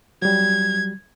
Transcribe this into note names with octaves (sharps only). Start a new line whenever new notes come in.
F#3 G3 G#6